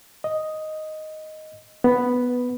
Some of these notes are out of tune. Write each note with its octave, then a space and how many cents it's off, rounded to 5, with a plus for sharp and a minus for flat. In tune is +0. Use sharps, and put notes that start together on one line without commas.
D#5 +0
B3 +0